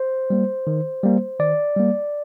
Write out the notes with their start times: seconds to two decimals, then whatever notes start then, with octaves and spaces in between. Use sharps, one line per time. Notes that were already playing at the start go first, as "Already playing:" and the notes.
Already playing: C5
0.30 G3 A#3
0.67 D#3
1.03 G3 A#3
1.40 D#3 D5
1.77 G3 A#3